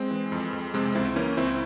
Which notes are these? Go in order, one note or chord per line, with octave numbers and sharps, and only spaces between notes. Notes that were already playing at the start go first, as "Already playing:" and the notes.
Already playing: G#3 C4
E3
F2
F2
C3 G#3 C4
C#2 C4 E4
E3 A#3 C#4
C#2 C4 E4